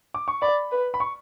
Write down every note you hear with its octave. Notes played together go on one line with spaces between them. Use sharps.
D6
C#6
D5 B5
B4
B5
C#6